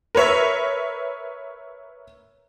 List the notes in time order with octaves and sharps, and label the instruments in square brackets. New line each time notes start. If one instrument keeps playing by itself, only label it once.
[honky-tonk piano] A#4 B4 C#5 E5